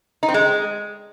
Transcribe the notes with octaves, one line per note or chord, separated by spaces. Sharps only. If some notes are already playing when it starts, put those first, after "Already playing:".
D#4
C4
G#3